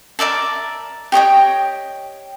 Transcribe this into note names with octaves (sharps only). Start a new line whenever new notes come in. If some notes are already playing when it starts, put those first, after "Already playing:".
A#4 D5 E5 A5
G4 C#5 D#5 G5